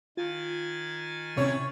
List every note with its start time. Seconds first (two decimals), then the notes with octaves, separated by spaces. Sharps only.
0.17 D#3 F4 G#5 A6
1.37 C3 C#4 E4 C#5